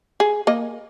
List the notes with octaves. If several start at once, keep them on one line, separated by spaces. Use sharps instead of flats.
G#4
A#3 D#5